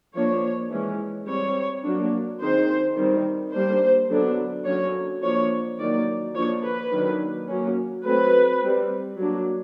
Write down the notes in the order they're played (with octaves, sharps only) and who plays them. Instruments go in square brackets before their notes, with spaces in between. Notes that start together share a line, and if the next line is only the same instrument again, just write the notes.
[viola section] F3 A#3 D4 C#5
E3 G#3 C#4
G3 C4 C#5
F#3 A#3 D4
D#3 G#3 C4 C5
D#3 G3 C4
G3 A#3 D4 C5
D3 F#3 B3 D4
D3 F#3 A#3 C#4 C#5
F3 A#3 D4 C#5
D#3 F#3 A#3 D5
F3 A#3 D4 C#5
B4
D#3 F#3 A#3 D4
F#3 A#3 C#4
F#3 A3 C4 B4
G3 C4
F#3 A#3 D4